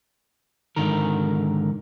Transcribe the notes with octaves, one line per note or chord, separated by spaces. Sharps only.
G#2 D3 D#3 A#4